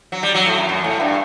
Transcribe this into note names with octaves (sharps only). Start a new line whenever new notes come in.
F#3
G3
F#3
A2
F#2
F#2
A2
G2